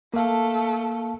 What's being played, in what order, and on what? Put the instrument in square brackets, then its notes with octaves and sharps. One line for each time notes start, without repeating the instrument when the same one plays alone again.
[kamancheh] A3 A4 [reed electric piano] A#3 F5